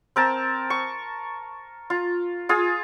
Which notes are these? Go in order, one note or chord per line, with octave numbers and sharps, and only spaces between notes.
C4 A#4 A5
C#6
F4
F4 G#4